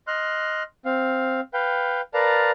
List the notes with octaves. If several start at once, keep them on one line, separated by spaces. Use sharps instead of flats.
D#5 C6 F6 F#6
C4 F5
B4 F5 G5
A#4 B4 D5 F5 A5 A#5